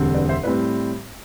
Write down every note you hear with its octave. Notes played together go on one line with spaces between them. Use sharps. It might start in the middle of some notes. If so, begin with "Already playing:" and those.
Already playing: E1 D2 D3 G3 C4
B4 D5
C5 E5
A2 G3 C4 B4 D5